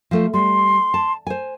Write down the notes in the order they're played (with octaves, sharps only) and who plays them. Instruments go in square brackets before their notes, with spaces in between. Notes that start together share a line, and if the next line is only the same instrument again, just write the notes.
[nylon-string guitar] F3 A3 F4
[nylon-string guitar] G3 [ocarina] C6
[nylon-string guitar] A5
C5 G#5